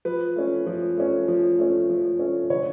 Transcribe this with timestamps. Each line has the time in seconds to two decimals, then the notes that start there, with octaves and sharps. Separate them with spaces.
0.05 F3 B4
0.36 A3 C#4
0.66 F3
0.97 A3 C#4
1.28 F3
1.59 A3 C#4
1.89 F3
2.19 A3 C#4
2.50 D3 C#5